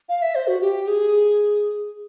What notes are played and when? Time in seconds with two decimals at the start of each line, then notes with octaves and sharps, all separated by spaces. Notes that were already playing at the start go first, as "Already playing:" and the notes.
0.09 F5
0.22 E5
0.35 C5
0.48 F#4
0.61 G4
0.87 G#4